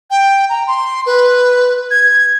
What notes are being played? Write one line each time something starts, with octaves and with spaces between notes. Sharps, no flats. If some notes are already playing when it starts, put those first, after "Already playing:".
G5
A#5
C6
B4
G#6